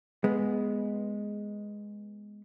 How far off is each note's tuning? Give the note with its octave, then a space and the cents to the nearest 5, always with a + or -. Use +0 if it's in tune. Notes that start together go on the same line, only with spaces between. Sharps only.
G#3 +0 B3 +0